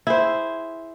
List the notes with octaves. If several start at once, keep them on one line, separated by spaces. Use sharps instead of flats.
E4 G#4 C5